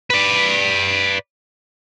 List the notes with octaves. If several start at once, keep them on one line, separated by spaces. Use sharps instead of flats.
B4 D5